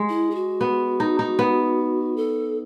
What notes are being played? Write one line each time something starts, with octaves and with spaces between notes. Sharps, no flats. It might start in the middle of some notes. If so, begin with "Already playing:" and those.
Already playing: G#3
E4
G#4
F#4
B3
D#4
D#4
B3
A4